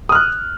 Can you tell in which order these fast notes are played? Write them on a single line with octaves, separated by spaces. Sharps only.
D#6 F6 F#6